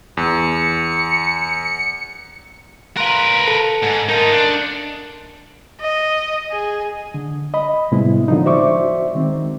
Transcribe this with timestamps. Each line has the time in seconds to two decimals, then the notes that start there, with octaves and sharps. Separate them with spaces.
0.17 E2 C#7
2.97 A#4 B4 F5 C6 F#6
3.47 A4 A5 C#7
3.83 G#2
4.08 D#4 F4 A#4 A5
4.32 D4 C#7
5.81 D#5
6.51 G#4
7.14 D3
7.54 D#5 B5
7.92 A2 C3 G3 G#3 B3 E4
8.28 D3 F3 D#4
8.46 F#4 C5 D5 E5 C#6 D6
9.15 D#3 G#3 C4